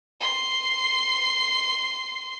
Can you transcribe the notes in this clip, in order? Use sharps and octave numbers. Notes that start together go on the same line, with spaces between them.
C6 C7